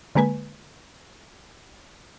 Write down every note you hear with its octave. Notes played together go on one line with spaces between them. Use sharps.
D3 G#3 A#3 B4 G#5